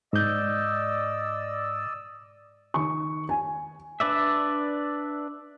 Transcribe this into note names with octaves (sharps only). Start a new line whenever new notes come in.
G#2 D5 D#5 E6 G6
D#3 C#6
G#5
D4 B4 D5 E5